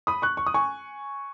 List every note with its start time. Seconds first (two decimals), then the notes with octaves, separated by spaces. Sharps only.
0.07 B5 D#6
0.22 C#6 F#6
0.37 C#6
0.46 D#6
0.54 G#5 C#6